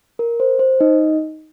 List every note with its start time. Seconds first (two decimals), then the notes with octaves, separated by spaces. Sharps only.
0.19 A#4
0.40 C5
0.59 C5
0.80 D#4 D#5